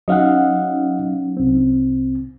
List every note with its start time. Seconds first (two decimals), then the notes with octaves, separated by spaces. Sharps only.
0.08 F#3 C#4 D#4 D#5 F5 F#5
1.37 C2 C4